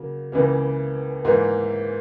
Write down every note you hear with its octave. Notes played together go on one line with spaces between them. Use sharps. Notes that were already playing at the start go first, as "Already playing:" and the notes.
Already playing: C#3 F#3 A#3
C#2 C#3 E3 A#3
G#2 E3 A#3